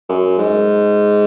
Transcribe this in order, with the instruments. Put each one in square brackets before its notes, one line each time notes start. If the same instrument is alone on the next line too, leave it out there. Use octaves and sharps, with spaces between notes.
[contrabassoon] F#2
G#2